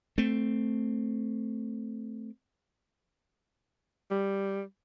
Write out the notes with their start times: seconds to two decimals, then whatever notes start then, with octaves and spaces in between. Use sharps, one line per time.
0.18 A3 C4
4.11 G3